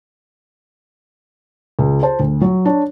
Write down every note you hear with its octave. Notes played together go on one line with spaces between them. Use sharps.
C#2
C5 A5
D2
F#3
D4 C#5